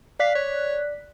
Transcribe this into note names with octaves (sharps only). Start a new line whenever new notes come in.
D5 F5 F#6 B6
C#5